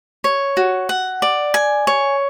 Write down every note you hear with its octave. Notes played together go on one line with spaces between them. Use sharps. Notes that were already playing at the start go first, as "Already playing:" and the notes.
C#5
F#4
F#5
D5
G#5
C#5